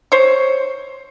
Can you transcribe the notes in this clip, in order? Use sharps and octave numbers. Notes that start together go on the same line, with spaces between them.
C5 C#5